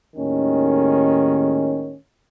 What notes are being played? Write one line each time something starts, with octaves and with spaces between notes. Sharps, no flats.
D#2 A2 D#3 G#3 C#4